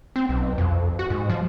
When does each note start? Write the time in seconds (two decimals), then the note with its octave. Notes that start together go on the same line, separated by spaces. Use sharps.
0.16 C4
0.29 B1
0.58 F2
0.99 F#4
1.10 G#2
1.30 F3